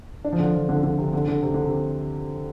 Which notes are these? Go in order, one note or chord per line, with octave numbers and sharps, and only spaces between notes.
D4
F3
D3
F3
D3
D3
C3
D3
D3
C3
D3
C3